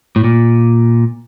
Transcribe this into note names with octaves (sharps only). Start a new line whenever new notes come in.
A2
A#2